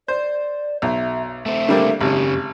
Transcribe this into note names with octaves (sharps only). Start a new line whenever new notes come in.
C5 D5
B1 E5
A3 C4 E5
D3 G3 A#3
G#1 F#2 C#3 G4